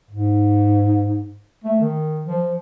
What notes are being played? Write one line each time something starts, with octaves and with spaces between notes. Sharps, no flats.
G#2
A3
D#3
F3